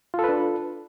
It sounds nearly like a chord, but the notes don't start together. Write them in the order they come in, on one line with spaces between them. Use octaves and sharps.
F4 A4 B4 D4